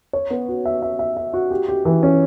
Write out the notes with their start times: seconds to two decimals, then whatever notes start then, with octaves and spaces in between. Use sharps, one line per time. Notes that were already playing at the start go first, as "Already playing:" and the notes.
0.13 C#5
0.30 B3
0.48 F#4
0.65 E5
0.82 E5
0.99 E5
1.17 E5
1.33 F#4
1.51 G4
1.69 G4
1.85 E3
2.03 C#4